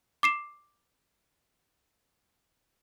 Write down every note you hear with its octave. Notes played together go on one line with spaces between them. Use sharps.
D6 C7 E7